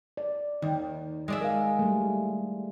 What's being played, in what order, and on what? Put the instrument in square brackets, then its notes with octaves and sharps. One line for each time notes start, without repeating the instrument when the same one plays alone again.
[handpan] D5
[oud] D#2 [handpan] D#3
[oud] G#3 D5 E5
[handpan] A#4 F5
G3 A3